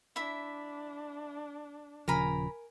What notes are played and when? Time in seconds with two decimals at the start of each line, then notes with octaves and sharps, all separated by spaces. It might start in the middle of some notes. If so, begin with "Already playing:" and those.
0.16 D4 E4 E5
2.08 D#1 C#3 F3 A#4 G#5 A#5 B5